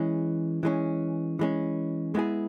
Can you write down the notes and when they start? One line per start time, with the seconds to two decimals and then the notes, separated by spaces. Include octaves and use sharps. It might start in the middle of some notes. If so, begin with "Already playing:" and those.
Already playing: E3 G#3 C#4
0.63 E3 G#3 C#4
1.39 E3 G#3 C#4
2.15 G#3 B3 E4 G#4